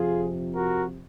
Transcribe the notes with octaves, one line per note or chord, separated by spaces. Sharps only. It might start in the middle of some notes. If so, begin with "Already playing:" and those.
Already playing: F2 C3 F3 F4 G#4
F#4 A#4